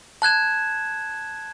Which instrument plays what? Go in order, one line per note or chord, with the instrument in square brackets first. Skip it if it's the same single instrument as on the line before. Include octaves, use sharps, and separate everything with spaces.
[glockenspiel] A5 F#6 G#6 E7